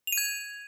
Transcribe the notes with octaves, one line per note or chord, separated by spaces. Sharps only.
F7
D#7
G#6